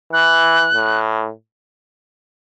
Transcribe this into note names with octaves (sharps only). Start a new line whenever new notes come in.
E3 F#6
A2